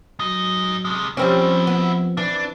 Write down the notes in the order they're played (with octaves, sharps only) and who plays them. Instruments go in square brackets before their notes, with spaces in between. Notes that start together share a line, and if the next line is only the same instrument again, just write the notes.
[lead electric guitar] G#2 D#5 [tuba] F#3
[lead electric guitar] C3 G#3
[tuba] F3 [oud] G3 C4 C#4 [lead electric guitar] E4 F#4
[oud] B3
[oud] E3 [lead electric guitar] D4